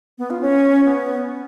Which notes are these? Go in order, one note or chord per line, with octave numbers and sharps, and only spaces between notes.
B3
F4
C#4
B3
B3